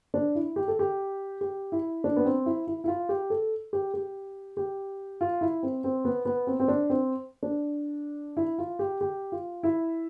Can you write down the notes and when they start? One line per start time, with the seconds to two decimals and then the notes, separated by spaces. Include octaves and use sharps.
0.14 D4
0.35 E4
0.56 G4
0.68 A4
0.79 G4
1.41 G4
1.72 E4
2.04 D4
2.16 B3
2.25 C4
2.46 E4
2.67 E4
2.84 E4
2.88 F4
3.09 G4
3.30 A4
3.73 G4
3.94 G4
4.57 G4
5.21 F4
5.41 E4
5.63 C4
5.84 C4
6.05 B3
6.25 B3
6.47 C4
6.60 C4
6.68 D4
6.90 C4
7.43 D4
8.37 E4
8.58 F4
8.79 G4
9.01 G4
9.32 F4
9.63 E4